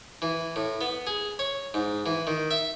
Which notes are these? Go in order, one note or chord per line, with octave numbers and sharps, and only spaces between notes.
E3
A2
B3
G#4
C#5
G#2
E3
D#3
E5